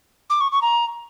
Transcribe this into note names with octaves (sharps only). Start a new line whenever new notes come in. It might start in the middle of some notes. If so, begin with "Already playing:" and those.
D6
C#6
C#6
A#5